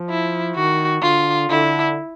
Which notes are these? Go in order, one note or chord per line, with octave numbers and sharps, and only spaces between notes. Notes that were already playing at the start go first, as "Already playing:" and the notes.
Already playing: F3
E4
D#3 F#4
D3 F4
D3 E4